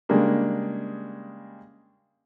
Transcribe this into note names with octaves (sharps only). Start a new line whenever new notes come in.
C#3 G3 G#3 A#3 D4